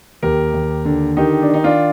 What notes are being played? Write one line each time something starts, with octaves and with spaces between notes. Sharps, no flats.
D#2 G4 A#4
D#2
D3
D#3 D#4 G4
D4
D#3
D#4
D4 F4